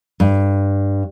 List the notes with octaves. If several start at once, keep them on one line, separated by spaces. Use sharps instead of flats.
G2